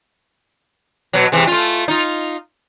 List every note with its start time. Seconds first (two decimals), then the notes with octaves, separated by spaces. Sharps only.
1.13 B2 F#3
1.32 C3 E3 G#3
1.47 A3 F4
1.88 D#4 F4